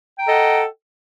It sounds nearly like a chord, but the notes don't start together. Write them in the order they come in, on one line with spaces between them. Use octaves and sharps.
G5 A#5 A4 D#5 F#5